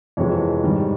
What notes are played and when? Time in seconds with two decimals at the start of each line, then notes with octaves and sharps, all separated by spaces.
0.17 F2 C3 E3 G#3 C#5
0.63 G#2 D#3 G3